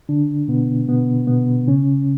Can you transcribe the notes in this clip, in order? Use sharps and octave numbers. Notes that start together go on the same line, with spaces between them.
D3 D4
B2 B3
B2 B3
B2 B3
C#3 C#4